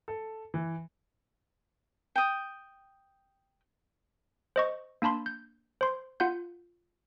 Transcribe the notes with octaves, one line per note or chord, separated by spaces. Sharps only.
A4
E3
G5 D#6
C5 D#5 C#6
A#3 D4 A5 B5 C6
G6
C5 C6
F4 F#5 G6